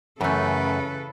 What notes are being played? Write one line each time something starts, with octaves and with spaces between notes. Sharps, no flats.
F#2 C#3 E3 A3 C#4 A4 B4